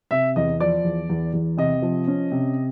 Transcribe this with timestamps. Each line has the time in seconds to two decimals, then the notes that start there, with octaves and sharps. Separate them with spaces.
0.11 C3 E5
0.36 E2 D#5
0.60 F3 D5
0.84 E2
1.09 E2
1.33 E2
1.57 C3 D#5
1.82 F3
2.08 C#4
2.32 C3